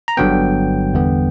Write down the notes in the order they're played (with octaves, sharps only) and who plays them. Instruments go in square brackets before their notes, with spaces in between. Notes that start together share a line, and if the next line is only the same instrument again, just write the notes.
[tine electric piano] A#5
G1 G2 D3 F#3 B3 G5
E2 D3 G3 B3